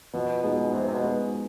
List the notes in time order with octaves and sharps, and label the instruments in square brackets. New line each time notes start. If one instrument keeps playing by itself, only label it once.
[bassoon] B2 [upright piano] F3
[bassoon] B2 [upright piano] G#3 B3 D#4 G#4
[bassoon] C3 [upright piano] F3
[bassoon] C3
B2
[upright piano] G#3 B3 D#4 G#4